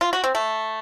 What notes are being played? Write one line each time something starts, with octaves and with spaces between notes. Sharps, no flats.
F4
F#4
C4
A3